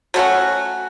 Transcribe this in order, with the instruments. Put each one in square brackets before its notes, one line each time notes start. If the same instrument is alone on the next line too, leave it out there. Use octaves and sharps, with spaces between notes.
[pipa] F#3 A3 C#4 F#4